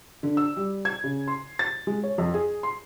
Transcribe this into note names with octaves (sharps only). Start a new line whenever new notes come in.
D3
E6
G3
G#6
C#3
C6
A6
G#3
C#5
F2
G#4
C6